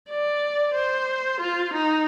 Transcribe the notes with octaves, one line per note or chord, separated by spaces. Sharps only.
D5
C5
F4
D#4